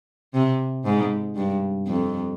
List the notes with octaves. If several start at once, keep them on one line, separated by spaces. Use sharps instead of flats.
C3
G#2
G2
F2